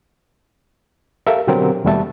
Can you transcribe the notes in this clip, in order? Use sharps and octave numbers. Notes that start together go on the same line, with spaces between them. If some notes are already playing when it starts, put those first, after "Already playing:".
G4 A4 A#4 E5 F5
B2 D3 F#3 C4 G4 A#4
D#2 B2 G3 A3 E5 A5